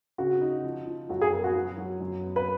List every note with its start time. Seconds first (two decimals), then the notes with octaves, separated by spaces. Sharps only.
0.18 C#3 F#4
0.41 D#4
0.64 F3
0.87 F3
1.10 F#2 F#4
1.21 G#4
1.32 B3 A#4
1.44 F#4
1.55 F#3
1.78 F#3
2.01 F#2
2.23 B3
2.36 B4